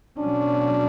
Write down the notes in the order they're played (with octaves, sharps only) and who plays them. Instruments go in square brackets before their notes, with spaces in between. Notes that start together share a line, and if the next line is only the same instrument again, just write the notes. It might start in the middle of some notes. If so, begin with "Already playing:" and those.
[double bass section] B2 F#3 C#4 [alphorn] D4